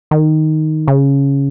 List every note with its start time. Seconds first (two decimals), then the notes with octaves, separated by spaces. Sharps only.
0.11 D#3
0.88 C#3